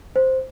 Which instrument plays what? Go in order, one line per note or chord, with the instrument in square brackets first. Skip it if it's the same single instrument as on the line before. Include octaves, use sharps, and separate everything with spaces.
[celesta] C5